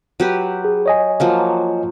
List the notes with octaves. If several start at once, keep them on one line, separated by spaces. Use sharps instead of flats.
F#3 G4 B4
G#4
C#5 D#5 G#5
F3 F#3 A#3